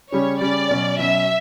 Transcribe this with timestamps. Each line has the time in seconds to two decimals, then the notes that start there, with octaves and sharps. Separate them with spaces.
0.12 C#3 G3 C#4 C#5
0.41 C#3 G3 C#4 D5
0.70 B2 F#3 C#4
0.99 B2 F#3 C#4 E5